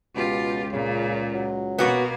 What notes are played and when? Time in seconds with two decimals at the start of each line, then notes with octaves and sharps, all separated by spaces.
0.15 C#2 B2 F4 G4
0.73 A#2 C#3
1.34 F#3
1.78 B2 A#3 B3 F#4